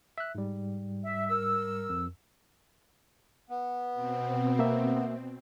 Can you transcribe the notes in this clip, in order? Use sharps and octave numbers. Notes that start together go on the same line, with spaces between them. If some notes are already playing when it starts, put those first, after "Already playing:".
E5 F#6
G#2 G3
E5
A#4 E6
F2
B3
B2 C4
A#3 E5